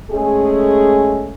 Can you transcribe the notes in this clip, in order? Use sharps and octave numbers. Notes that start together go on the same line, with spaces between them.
G#3 A3 C#4 G#4